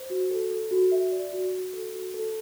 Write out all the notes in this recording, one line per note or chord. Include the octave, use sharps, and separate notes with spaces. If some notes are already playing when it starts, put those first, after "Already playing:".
Already playing: C5
F#4
A4
A4
F#4
E5
D5
F#4
F#4
A4
F#4
A4